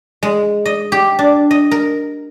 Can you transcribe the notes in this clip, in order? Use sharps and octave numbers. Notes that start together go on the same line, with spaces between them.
G#3
D#5
G4
D4
D#5
A#4